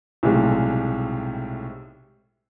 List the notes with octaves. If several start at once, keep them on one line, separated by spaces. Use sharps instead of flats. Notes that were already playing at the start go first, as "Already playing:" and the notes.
B1 A2 C3 G3 G#3